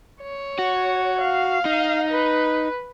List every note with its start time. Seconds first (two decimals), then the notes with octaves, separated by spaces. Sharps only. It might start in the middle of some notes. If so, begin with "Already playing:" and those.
0.22 C#5
0.59 F#4
1.21 F5
1.65 D#4
2.11 B4